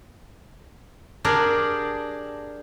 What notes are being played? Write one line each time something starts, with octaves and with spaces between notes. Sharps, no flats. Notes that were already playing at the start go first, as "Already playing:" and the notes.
D4 G4 G#4 A#4 D5